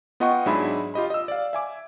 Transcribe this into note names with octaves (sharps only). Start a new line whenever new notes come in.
B3 F4 D#5 F#5 G5 C#6
G#2 F#3 D4 G#4 E5 B5
F4 G4 D#5 B5
D#5 E6
D5 F5
E5 G#5 D6